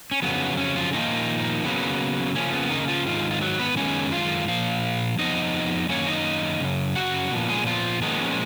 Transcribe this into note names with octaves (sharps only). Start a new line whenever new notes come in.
C#4
F2 C#3 F#3 B3
C#4
F3 F4
A#2 D#3 F3 A#3 D#4
C#3 F#3 A#3 B3
C#3 F3 A#3 C#4
B3
D#3 D#4
F3 F4
G#2 D#3 F4
F4
F#3 F#4
B3 B4
F#2 D#3 G#3 B3 C#4 C#5
F4 F5
A#2 F3 F5
F2 F3 B3 D#4 D#5
F#2 D#3 A#3 C#4 C#5
D#4 D#5
F#2 C#3
F#4 F#5
A#2 F3 B3
G#3 G#4
F3 F4
A#2 D#3 F3 G#3 B3 D#4
C#4